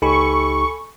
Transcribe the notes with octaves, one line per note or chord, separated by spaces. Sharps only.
C#2 D#4 G4 A4 G#5 B5 C#6